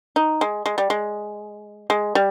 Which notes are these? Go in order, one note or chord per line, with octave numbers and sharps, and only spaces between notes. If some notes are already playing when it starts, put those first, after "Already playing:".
D#4
G#3
G#3
G3
G#3
G#3
G3